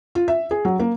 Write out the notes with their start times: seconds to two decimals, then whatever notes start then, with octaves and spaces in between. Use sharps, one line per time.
0.15 F4
0.28 E5
0.51 G#4
0.65 F#3
0.80 A#3